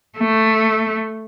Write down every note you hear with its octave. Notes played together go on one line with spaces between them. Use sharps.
A3